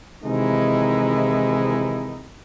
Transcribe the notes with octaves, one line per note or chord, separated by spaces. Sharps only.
C3 D#3 E3 G#3 D#4 E4